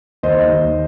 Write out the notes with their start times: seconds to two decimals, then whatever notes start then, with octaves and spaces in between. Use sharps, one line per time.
0.23 D#2 C5 D#5
0.48 D#2